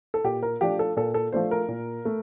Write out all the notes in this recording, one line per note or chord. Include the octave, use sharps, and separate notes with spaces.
A4
A#2 G4
A#4
F3 A3 D4 G4
A4
A#2 A4
A4
F3 A3 D4 C5
A#4
A#2
A3